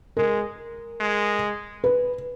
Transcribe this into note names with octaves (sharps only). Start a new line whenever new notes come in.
G#3 A#4
G#3
B4